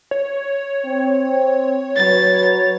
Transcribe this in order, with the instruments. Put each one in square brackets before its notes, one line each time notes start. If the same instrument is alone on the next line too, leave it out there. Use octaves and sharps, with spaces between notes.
[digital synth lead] C#5
[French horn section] C4
[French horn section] F#3 B4 [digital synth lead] C#5 [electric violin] A6